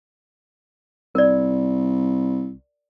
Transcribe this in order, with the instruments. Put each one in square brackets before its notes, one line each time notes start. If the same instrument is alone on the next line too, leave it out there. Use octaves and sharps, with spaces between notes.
[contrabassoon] C2 [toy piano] A#4 D5